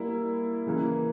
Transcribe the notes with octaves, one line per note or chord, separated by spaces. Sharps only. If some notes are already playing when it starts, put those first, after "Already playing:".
Already playing: G3 A#3 E4
C#3 E3 A#3